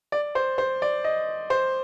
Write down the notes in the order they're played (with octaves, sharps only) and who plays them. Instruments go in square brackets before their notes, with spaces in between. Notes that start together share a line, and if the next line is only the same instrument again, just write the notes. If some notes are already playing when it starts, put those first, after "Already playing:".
[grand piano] D5
C5
C5
D5
D#5
C5